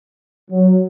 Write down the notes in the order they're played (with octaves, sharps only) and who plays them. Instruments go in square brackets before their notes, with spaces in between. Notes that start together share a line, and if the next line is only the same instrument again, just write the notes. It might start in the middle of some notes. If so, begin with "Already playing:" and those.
[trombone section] F#3